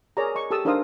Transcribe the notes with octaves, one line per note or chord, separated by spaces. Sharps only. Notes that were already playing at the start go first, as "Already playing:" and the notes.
G#4 A#4 C#5 D5 A#5
D#5 C#6
G4 A4 A5 D#6 E6
D4 D#4 A#4 C5 F5 D#6